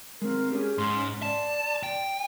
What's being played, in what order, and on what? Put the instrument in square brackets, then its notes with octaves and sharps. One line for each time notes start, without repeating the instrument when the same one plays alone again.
[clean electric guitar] G#3 C4 [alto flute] A#4
[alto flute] C#4 [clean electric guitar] G4 G#4
[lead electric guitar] G#2 [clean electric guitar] C6
[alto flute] D5 [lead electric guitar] A5
[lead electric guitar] G5